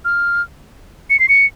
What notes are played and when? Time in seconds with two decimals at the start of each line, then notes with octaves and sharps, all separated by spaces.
0.05 F6
1.10 C#7
1.20 C7
1.29 C#7